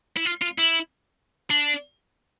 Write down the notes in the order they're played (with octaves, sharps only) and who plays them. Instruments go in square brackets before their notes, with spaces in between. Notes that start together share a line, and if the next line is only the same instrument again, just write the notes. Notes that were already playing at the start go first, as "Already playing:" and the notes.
[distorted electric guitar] E4
F4
F4
E4
D4